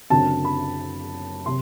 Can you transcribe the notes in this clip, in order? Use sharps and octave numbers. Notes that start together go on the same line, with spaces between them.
F#1 F#2 D3 F#3 C4 A5
B5
C3 C6